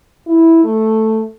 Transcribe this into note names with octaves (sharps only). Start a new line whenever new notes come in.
E4
A3